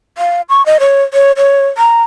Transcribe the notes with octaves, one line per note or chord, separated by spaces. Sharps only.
F5
C#6
D#5
C#5
C#5
C#5
A#5